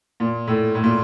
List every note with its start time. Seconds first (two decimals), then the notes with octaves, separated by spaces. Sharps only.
0.20 A#2
0.47 A2
0.75 A2
0.83 A#2